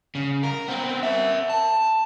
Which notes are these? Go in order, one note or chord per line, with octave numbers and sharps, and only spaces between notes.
C#3
A#4
B3 C4
A#4 E5
A5